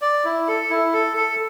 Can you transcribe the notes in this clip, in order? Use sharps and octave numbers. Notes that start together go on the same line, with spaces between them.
D5
E4
A4
E4
A4
A4